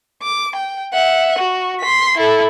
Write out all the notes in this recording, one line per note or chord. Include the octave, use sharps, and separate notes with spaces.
D6
G5
E5 F#5
F#4
C6 B6
E4 A4